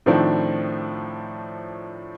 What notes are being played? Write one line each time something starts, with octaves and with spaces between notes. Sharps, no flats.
A2 D#3 F3 A3 C4 D4